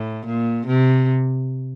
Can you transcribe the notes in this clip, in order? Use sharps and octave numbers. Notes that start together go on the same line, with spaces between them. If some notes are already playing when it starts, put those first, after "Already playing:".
Already playing: A2
A#2
C3